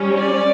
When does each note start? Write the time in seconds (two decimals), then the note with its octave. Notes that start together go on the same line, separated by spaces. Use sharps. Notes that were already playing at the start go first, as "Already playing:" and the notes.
Already playing: G3 C#4
0.20 D5